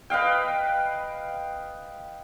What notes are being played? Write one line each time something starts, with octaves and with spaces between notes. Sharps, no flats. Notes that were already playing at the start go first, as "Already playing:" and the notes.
B4 D#5 F5 G5